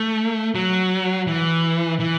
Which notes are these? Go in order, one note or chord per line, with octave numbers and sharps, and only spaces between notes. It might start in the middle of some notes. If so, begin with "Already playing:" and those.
Already playing: A3
F#3
E3
E3